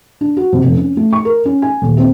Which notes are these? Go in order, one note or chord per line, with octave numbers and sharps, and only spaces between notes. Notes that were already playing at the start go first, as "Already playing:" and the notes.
D4
F#4
C3
F1
C#4
A3
C#6
A#4
C#4
G#5
D#1
C4